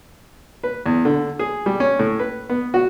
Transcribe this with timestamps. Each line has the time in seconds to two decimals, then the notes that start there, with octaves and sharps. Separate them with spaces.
0.63 B4
0.86 E2
1.05 D3
1.39 G#4
1.66 G3
1.80 C#4
1.99 A2
2.19 B4
2.50 B3
2.74 F#4